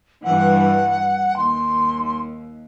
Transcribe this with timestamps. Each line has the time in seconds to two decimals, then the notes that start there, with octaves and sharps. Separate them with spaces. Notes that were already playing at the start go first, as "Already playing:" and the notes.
0.24 G2 E3 F#5
1.36 D#2 C6